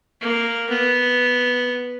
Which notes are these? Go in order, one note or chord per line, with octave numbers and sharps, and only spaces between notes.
A#3
B3